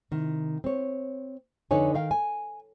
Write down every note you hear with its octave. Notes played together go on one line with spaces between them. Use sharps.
C3 D#3
C4 C#5
F2 D3 D#4 B4 C#5 G#5
D#3 A#4 F5 G5
G#5